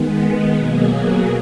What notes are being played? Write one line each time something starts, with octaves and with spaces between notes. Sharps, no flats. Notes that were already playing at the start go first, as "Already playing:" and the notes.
Already playing: D#3 G#3 B3
B2 F#3 A#3 G#4
G#4